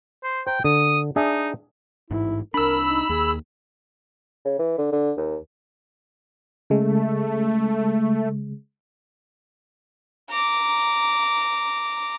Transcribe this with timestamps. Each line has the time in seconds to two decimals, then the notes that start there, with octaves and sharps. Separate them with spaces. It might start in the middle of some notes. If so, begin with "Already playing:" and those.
0.23 C5
0.47 C5 G5 A#5
0.64 D3 D#6
1.16 D4 D#4 G#4 E5
2.11 A1 G#2 E4
2.54 C2 D4 A#4 B5 E6
2.87 D#4
3.09 D#2 G#4
4.45 C#3
4.59 E3
4.78 D3
4.92 D3
5.17 D#2
6.70 C#3 G#3 A3
10.30 A#5 D6